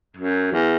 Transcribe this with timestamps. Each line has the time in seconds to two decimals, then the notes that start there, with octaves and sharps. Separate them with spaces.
0.17 F#2
0.52 E2